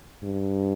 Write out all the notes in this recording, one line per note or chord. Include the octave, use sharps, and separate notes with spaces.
G2